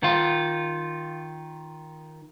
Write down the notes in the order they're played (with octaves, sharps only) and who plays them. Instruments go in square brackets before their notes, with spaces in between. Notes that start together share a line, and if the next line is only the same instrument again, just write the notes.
[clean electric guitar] D#3 F4